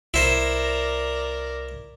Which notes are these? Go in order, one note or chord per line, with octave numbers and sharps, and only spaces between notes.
C2 E4 A#4 C5 D5